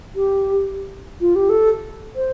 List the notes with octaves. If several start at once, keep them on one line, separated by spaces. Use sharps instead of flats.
G4
F4
G4
A4
C5